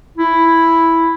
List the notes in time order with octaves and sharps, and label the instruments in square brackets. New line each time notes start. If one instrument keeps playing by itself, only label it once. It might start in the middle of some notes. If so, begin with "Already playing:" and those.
[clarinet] E4